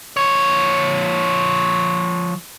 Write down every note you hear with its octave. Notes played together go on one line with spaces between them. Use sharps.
F3 C#5